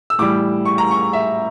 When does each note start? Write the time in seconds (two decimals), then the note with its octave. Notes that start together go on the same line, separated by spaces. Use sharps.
0.10 E6
0.19 A2 E3 G3 D6
0.65 C#6
0.78 A#5
0.91 C#6
1.13 E5